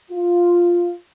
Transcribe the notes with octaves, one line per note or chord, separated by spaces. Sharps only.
F4